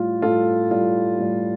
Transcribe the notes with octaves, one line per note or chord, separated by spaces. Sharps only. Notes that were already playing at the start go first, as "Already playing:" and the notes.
Already playing: A2 G3 F4
A2 G3 F4 A4
A2 G3 F4
A2 G3